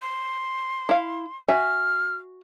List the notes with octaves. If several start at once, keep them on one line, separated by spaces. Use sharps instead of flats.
C6
E4 F5
F#4 E5 G#5 F6